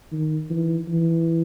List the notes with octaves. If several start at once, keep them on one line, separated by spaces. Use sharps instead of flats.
D#3
E3
E3